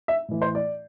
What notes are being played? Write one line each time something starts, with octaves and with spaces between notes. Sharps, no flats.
E5
A2 E3
C5
D5